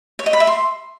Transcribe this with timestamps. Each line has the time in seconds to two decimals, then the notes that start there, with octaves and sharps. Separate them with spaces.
0.19 C#5
0.26 D#5
0.33 B5
0.40 E5
0.47 C6